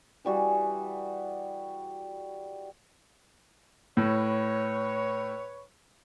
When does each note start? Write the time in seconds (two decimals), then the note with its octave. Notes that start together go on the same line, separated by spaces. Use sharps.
0.25 E3 G3 F#4 G#4
3.97 A2 B4 C#5